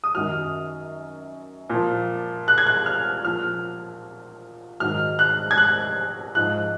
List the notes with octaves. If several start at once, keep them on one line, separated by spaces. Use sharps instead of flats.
D#6
F#2 D#3 F#3 F6
A#2 F3
F#6
G#6
F#6
F6
A#2 F3 F6
G#2 D#3 F#3 F6
F#6
G#6
F#6
G#2 F3 F#6